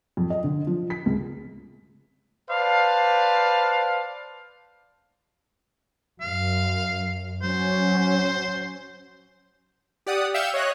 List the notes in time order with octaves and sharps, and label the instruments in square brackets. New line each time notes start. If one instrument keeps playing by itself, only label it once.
[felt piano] F2
D#5
D3
F3
B6
C#2
[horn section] B4 C5 D5 F5 A5
[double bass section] F#2 [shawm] F5
[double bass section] F#3 C#4 [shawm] C5
[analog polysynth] G4 D5 F#5 D#6
E5 F5 G5 G6 C#7 E7
C#5 D#5 F#6